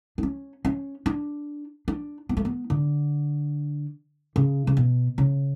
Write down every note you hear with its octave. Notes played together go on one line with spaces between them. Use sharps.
D4
C#4
C#4
D4
D4
B3
A3
B3
D3
C#3
C#3
B2
C#3